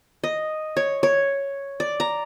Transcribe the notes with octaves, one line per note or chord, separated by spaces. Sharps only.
D#5
C#5
C#5
D5
A#5